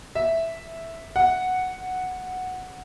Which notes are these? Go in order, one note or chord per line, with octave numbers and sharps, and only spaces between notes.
E5
F#5